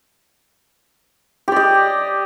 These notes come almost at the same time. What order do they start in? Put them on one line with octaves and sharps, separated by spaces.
G4 D5 D#5